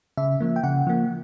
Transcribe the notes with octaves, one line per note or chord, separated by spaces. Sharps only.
C#3 E5
F3 A#3
G5
C#3 F#5
F3 A#3